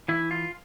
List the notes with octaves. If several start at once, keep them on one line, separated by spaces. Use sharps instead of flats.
E3 E4
F4